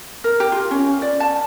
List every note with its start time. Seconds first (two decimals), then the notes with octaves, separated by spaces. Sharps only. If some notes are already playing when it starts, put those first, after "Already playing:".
0.24 A#4
0.40 G4
0.52 F4
0.71 C#4
1.02 D5
1.20 A5